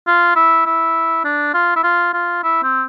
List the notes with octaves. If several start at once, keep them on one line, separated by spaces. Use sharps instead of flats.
F4
E4
E4
D4
F4
E4
F4
F4
E4
C4